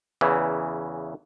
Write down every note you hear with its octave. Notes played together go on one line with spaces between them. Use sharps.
E2 C#3 E3